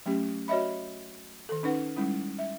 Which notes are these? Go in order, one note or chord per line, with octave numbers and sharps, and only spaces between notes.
F#3 A3 C#4 G4
F#4 C#5 D#5 E5 B5
D#3 A4
C#4 D#4 B4 F#5
G3 G#3 C#4 E4
E5